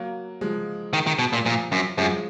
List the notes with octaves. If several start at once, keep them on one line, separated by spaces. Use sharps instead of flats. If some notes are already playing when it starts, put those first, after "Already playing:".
Already playing: F#3 A#3
F3 G#3
D#3
D#3
B2
A#2
A#2 F3
F#2
F#2 F3 G#3